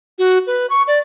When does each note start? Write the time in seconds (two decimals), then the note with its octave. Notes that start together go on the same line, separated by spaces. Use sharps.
0.19 F#4
0.47 B4
0.70 C#6
0.87 D5